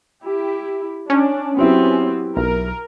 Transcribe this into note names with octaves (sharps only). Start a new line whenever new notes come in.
E4 G4
C#4 D4
F#3 B3 C4 E4 G4
B1 A#4